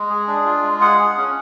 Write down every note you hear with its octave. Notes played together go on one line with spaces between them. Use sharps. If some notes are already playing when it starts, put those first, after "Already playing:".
Already playing: G#3
G#4
D4
F4
G#3
G#4 F#5
G#4
C#4